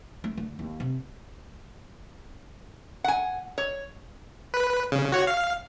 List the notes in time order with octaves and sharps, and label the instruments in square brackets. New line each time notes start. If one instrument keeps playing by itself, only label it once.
[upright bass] A3
D3
D#2
C3
[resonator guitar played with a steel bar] F#5 G#5
C#5
[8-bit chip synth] B4
C#3
F#4 C#5
F5